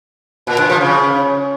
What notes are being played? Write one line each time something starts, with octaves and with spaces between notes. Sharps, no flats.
A#2
G2
F3
C#3